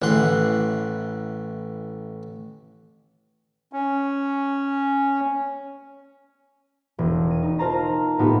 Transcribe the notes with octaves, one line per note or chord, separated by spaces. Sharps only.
A1 E3 F#5 C6
C#4
E1
D#7
D#4
F4 A#4 C5 A5 A#5 A#6
A2 B3 D#4 F4 G4